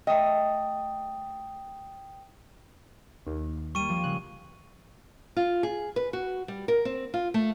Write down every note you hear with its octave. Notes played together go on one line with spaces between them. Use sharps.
A3 D#5 G5 D#6
D#2
G3 A#3 C#6 D#7
F3
C#3 F#6
F4
G#4
B4
F#4
G3
A#4
C4
F4
A3